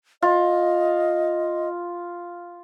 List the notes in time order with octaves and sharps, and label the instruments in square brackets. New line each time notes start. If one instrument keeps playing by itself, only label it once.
[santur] F4 [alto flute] D#5